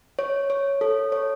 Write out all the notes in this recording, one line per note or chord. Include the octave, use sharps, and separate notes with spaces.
C#5
C#5
A4
C#5